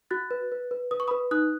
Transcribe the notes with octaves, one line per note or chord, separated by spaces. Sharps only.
F#4 F#6 A6
B4
B4
B4
B4 D#6
C#6
B4 B5 D#6
D#4 D#6 F#6